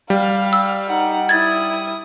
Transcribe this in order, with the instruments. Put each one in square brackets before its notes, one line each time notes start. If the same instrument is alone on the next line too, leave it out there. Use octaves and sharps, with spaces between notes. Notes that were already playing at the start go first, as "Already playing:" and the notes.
[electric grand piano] G3 [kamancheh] F5
[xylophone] E6
[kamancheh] D#4 F#5
[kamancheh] E4 D#6 [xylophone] G#6 A6